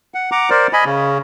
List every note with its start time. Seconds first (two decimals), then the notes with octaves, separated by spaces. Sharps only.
0.14 F#5
0.32 F#5 A#5 D6
0.50 A#4 C5 D5
0.73 D#5 G#5 B5
0.85 C#3